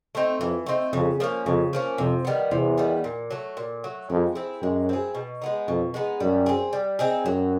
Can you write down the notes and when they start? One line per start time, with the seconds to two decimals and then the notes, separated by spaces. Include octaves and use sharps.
0.15 A3 C4 D#4
0.40 F2 E3
0.66 A3 C4 D#4
0.93 F2 C#3
1.20 F3 A#3 C#4
1.46 F2 C#3
1.73 F3 A#3 C#4
1.98 F2 C3
2.25 D#3 G3 B3
2.51 E2 C3
2.78 D#3 G3 B3
3.04 A#2
3.31 F#3 A3
3.57 A#2
3.84 F#3 A3
4.10 F2 G#3
4.35 C4 E4 G#4
4.62 F#2 G#3
4.89 C4 E4 G#4
5.15 B2
5.42 G#3 B3 D#4
5.68 F2 B2
5.94 G#3 B3 D#4
6.20 F#2 G3
6.46 C4 D#4 G#4
6.73 G3
6.99 C4 D#4 G#4
7.25 F#2 F#3